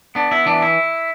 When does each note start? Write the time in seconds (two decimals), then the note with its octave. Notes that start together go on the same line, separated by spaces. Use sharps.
0.15 B3 D4
0.31 B3 E4
0.46 E3 D4
0.62 E4